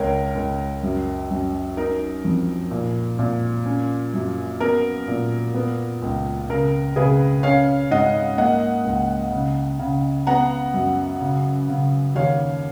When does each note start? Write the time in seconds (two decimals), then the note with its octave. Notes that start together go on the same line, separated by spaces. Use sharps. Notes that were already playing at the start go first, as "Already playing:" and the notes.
Already playing: C#2 A#4 C#5
0.35 C#2
0.83 F#2
1.31 F#2
1.77 D#4 A#4
2.25 F2
2.71 A#2
3.19 A#2
3.66 C#4
4.14 F#2
4.60 B3 A#4
5.08 A#2
5.54 B3
6.02 C#2
6.49 C#3 A#4
6.96 C#3 G#4 B4
7.43 C#4 C#5 F5
7.91 G#2 D#5 F#5
8.38 A#3 D#5 F#5
8.85 C#2
9.32 C#3
9.79 C#3
10.27 B3 F#5 A#5
10.74 F#2
11.21 C#3
11.69 C#3
12.15 D#2 C#5 F5